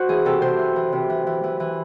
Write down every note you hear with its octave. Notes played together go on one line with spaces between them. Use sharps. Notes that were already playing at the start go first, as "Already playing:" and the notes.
Already playing: F#4 C5
E3 G#4
C3 A4
C3 C5
E3
E3
C3
E3
E3
E3
E3